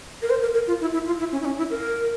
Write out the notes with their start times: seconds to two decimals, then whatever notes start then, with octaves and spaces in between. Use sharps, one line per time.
0.22 A#4
0.30 C5
0.42 A#4
0.54 A#4
0.67 F4
0.81 E4
0.94 E4
1.06 F4
1.19 E4
1.32 C#4
1.41 E4
1.45 C#4
1.58 E4
1.71 A#4